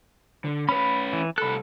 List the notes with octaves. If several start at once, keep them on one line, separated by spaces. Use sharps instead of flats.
D3
C#4 B4 B5
E3
C2 A4 B5 F#6